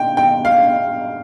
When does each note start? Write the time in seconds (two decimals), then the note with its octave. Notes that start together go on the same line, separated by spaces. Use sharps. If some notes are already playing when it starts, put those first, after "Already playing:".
Already playing: G5
0.17 G5
0.45 F5